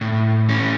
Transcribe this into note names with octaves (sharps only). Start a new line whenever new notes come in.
A2
E3 C#4